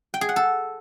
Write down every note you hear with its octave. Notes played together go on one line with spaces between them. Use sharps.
G5
G#4
F#5
A4